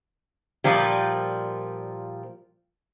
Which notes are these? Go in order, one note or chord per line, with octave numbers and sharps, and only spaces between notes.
A#2 F3 G3